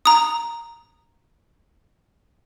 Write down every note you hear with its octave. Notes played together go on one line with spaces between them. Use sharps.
A#5 D#6